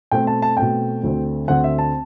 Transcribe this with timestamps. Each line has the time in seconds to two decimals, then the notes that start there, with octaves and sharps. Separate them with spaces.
0.11 B2 A3 C4 G5
0.27 A5
0.42 A5
0.57 B2 A3 C4 G5
1.03 D2 D3 A3 C4
1.48 D2 D3 A3 C4 F#5
1.64 E5
1.78 A5